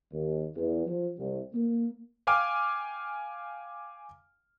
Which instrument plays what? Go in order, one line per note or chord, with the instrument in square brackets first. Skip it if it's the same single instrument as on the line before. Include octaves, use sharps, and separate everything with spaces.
[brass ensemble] D#2
E2
F3
C2
A#3
[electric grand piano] F5 G5 G#5 D6 F6